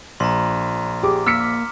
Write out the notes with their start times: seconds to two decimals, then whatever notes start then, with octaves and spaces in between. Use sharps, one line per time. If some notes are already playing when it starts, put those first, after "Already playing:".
0.20 A#1 A#5 C6
1.03 G4 G#4 D6
1.27 A#3 E6 F6 B6 C#7